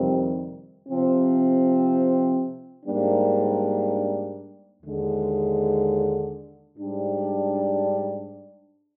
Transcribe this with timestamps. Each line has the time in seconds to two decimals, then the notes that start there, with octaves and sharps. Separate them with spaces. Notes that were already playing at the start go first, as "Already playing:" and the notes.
Already playing: F2 C3 D#3 G3 C4
0.89 C3 F3 C4
2.86 G#2 G3 A#3 D4
4.82 D#2 D3 G#3
6.78 G#2 G3 D4